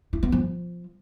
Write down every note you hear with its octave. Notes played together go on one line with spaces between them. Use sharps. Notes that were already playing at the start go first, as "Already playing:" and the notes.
E4
B3
F3